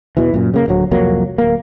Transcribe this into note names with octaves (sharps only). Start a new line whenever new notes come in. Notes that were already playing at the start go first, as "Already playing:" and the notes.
E2 B2 E3
F#2 A#2
C#3 A#3
D1 D2 F#3
C2 F2 F#3 A#3
D1 A#3